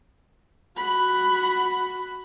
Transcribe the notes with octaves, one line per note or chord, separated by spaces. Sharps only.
F#4 B5